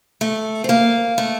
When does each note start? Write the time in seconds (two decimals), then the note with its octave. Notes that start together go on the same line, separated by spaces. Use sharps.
0.21 A3
0.64 C4
0.69 A#3
1.18 A3